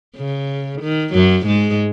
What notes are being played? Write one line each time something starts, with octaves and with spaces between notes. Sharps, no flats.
C#3
D#3
F#2 F#3
G#2 G#3